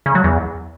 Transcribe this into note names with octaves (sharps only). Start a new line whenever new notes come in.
C#3
F#3
E2